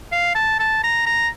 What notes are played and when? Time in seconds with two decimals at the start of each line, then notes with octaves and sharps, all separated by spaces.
0.12 F5
0.35 A5
0.59 A5
0.84 A#5
1.06 A#5